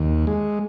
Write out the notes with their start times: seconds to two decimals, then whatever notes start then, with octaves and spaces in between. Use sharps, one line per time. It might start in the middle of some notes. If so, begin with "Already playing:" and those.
Already playing: D#2
0.27 G#3